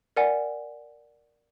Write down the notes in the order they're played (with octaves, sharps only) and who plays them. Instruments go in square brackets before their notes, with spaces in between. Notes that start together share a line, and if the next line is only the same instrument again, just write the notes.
[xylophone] A#4 D5 F#5 G#5